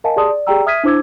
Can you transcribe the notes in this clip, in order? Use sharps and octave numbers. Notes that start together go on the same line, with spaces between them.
A#4 D#5 F5 G#5 A5
G4 G#4 D5 A5 C6 D#6
D5
G4 G#4 D5 G5 A#5 E6
E5 D#6 F6 G#6 B6 D#7
D4 E4 C5 D6 E6 G#6